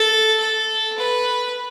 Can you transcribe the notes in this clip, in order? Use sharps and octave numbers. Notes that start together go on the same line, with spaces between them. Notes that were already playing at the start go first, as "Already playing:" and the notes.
Already playing: A4
A4
B4